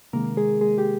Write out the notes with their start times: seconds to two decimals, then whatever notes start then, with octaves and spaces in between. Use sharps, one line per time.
0.13 C3 D#3 G#3 A#3 A#4
0.37 G#3 G#4
0.61 G#3 G#4
0.78 G4